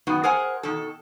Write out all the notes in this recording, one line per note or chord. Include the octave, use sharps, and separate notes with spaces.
F#2 D#3 B3 F#4
G#4 A#4 C5 F#5 G#5
B2 D#3 A4